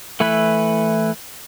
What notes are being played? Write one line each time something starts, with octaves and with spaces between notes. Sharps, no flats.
E3 A3 E4 B4